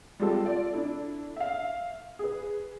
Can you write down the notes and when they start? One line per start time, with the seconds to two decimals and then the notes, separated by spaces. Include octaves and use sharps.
0.20 G3 G#3 C4 F4 G4 A4
0.44 F4 A4 D5
0.73 D4 E4 A4
1.36 E5 F5
2.19 G#4 B4